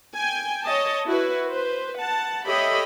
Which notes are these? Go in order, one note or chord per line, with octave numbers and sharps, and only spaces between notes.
G5 G#5
C#5 D#5 A5
E4 F#4 B4
B4 C5
F#5 A5
G4 A4 C#5 D#5 E5 B5